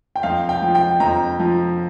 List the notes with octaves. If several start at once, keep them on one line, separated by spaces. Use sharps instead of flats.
G5
F2 F5
G5
F3
G5
F2 A#5
F3